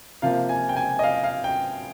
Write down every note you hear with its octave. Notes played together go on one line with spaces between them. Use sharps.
C3 F3 A#3 F5
G#5
G5
G#5
D#5
F5
F5
G5